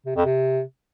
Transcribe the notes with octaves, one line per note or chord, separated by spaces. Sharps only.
C3
F2
C3